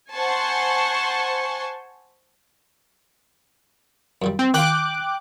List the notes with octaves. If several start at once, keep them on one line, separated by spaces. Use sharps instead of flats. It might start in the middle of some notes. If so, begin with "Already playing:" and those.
C5 F#5 G#5 A5 C6 C#6
F#2 A#2 G3
C4
D#3 F4 G5 D6 F#6